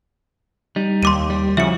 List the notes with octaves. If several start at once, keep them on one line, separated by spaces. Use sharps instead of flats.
G3 D#4
D#2 C6 D6 D#7
G3
C#3 F3 E4 F#4 E5 C#7